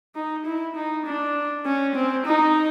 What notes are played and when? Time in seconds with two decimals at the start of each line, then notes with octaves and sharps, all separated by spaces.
0.15 D#4
0.46 E4
0.76 D#4
1.06 D4
1.66 C#4
1.95 C4
2.26 D#4